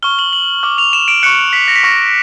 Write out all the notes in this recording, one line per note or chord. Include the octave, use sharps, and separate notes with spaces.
C#6 F6 G7
F#7
F#7
D6 F6
F7
E7
D7
C#6 F#6 C#7
B6
A#6
B6
C#6 F6 A#6